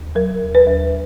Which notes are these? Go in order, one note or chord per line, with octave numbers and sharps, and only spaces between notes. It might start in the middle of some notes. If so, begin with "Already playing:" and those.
Already playing: D#2
F#3 A#4
D#2
B4
D#2